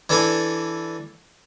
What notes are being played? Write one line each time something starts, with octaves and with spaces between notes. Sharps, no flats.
E3 D4 A4 G#5